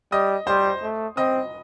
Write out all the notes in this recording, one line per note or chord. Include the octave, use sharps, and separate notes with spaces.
G3 D#5 D#6
G3 C5 C6
A3
C4 D#5 D#6